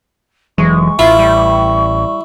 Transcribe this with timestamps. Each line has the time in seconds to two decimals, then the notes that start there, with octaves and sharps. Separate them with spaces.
0.58 F1 E3 F#3 G#3 C#6
0.99 A1 E4 F4
1.19 G3